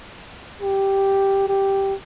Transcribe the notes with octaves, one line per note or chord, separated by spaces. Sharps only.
G4
G4